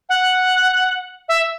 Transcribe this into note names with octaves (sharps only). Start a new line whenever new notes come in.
F#5
E5